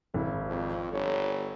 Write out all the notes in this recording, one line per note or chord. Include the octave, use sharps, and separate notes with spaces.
G#1 E4
F2
G1 C#5